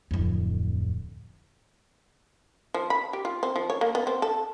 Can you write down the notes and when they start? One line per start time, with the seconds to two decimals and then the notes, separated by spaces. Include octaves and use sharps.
0.11 D1 F2
2.74 F3
2.90 B5
3.13 G4
3.25 F4
3.43 C4
3.56 F3
3.70 C#5
3.81 A#3
3.95 B3
4.07 C4
4.22 A4